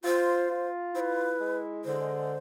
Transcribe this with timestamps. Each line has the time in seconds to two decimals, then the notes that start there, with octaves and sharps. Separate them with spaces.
0.05 F4 C5
0.50 F4
0.94 E4 C5
1.00 B4
1.39 G#3
1.85 D3 C5